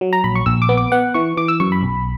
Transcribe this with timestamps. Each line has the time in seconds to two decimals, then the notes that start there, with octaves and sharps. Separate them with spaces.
0.01 F#3
0.13 A#5
0.24 A#1 B5
0.35 C#6
0.46 A#1 E6
0.62 D6
0.69 B3
0.77 D6
0.92 B3 F#5
1.14 E3 C#6
1.37 E3 D6
1.48 E6
1.60 F#2 C#6
1.72 B5
1.83 B1